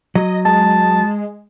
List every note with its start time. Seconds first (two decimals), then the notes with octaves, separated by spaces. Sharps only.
0.15 F#3 D#5
0.45 G#3 A5